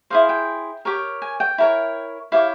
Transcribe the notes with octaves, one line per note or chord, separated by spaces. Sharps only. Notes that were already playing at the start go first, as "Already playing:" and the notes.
E4 G#4 C5 F5
G5
G4 A#4 C#5
G#5
G5
E4 A#4 C#5
E4 G4 C#5 F5